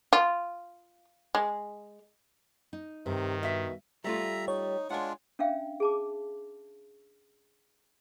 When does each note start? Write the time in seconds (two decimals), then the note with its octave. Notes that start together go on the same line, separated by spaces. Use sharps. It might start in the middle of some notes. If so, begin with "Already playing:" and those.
0.13 F4
1.35 G#3
2.73 D#4
3.06 G2 C3 D#3
3.43 B2 D#5 E5
4.04 G3 A3 F4 E5 A#5
4.48 D#4 C#5
4.90 G#3 D4 F4 F#5 G#5
5.39 C#4 D4 E5 F5 G5
5.80 G#4 A5 D6